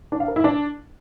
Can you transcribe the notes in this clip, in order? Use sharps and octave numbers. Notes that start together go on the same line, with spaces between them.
D4
F5
A#4
E4
D4